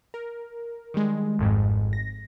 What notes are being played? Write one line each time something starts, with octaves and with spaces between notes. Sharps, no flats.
A#4
D#3 G3 G#3
G#1 F2 G#2
A#6